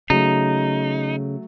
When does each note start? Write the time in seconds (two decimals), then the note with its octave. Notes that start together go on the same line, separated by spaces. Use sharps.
0.10 C#3 F#3 A3 D#4